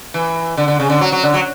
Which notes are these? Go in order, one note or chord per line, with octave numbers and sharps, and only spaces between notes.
E3
D3
D3
C#3
D3
F#3
F#3
D3
F#3